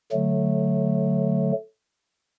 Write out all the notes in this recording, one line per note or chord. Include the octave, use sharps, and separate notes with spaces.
D3 F#3 A3